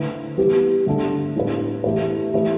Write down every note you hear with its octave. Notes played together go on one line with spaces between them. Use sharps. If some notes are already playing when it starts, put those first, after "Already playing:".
Already playing: D3 A3 E4 B4
E3 G3 B3 G4
G2 D3 A3 D4 A4
A2 G3 D4 B4
E3 A3 G4 B4
E3 A3 G4 B4